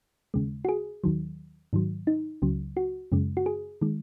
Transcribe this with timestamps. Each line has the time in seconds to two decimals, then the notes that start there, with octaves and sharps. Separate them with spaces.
0.34 D#2 C#3 G#3
0.65 F#4
0.69 G#4
1.04 D#2 D#3 F#3
1.73 G#2 D#3 F#3
2.07 D#4
2.42 C#2 C#3 F#3
2.77 F#4
3.12 F#2 C#3 G#3
3.37 F#4
3.46 G#4
3.81 D#3 G#3